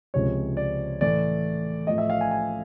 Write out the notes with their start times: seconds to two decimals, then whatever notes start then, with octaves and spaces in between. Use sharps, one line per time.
0.14 C#2 C3 F3 G#3 C#5
0.57 D5
1.01 A2 E3 A3 D5
1.87 A2 F3 A3 D#5
1.98 E5
2.10 F5
2.21 G#5
2.31 G#5